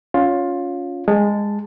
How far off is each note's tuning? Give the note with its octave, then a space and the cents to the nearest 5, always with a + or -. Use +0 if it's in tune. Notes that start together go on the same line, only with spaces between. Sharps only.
C#4 +15 F4 +15
G#3 -15 A5 +0